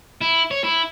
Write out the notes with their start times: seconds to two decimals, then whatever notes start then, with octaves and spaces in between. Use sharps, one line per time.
0.21 E4
0.51 C#5
0.64 E4